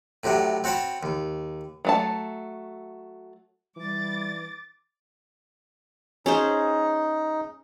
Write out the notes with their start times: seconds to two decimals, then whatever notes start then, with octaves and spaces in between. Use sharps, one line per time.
0.23 A2 C3 F#3 D4
0.64 C4 F#4 C#5 A5 B5
1.03 D#2
1.85 F#3 A3 A5
3.76 E3 G3 D6 A6
6.26 C#4 D#4 G#4 C5